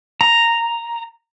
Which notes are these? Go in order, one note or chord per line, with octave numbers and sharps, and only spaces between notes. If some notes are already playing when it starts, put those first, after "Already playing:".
A#5